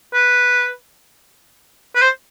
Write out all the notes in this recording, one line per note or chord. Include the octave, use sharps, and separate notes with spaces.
B4
B4
C5